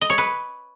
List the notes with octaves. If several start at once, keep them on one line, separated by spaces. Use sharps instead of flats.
D#5
C#5
B4